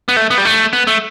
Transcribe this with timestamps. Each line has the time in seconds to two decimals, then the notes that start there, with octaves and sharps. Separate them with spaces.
0.08 B3
0.16 A3
0.30 B3
0.38 G3
0.45 A3
0.73 B3
0.87 A3